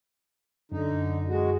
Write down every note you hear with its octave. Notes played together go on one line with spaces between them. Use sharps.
F#2 D3 D#4
G#3 F#4